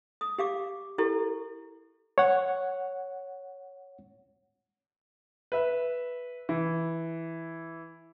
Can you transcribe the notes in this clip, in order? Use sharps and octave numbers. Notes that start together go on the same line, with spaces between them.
D#6
G4 F5 D6
E4 G4 A4 A#4
C#5 F#5
B4 E5
E3